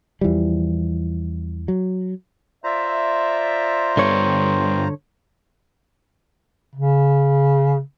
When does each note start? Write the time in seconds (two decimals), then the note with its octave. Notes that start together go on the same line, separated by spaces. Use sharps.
0.21 E2 E3 F3 G3
1.68 F#3
2.64 F4 C5 D5 E5 A#5
3.97 G2 D3 B3 C#5
6.75 C#3